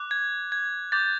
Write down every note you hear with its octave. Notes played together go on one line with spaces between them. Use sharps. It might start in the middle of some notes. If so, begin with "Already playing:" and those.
Already playing: D6 F#6
G#6
G#6
D6 G6 A6